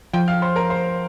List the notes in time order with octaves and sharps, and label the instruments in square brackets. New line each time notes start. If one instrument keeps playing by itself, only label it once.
[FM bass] F3 [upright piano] G5 G6
[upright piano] F5 F6
C5 C6
A#4 A#5
C5 C6